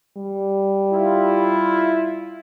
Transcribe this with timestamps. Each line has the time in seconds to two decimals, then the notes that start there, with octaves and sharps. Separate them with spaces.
0.17 G3
0.92 E4 F4